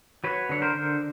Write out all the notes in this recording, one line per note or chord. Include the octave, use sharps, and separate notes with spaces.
F#3 B4 C#5
D3 C#5
A#4 C5
D3